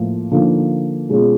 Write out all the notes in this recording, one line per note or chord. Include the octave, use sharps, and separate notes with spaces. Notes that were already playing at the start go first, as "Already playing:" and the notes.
Already playing: A2 F3 A#3
D3 F3 A#3 D#4
B2 G#3 C#4 F4 G#4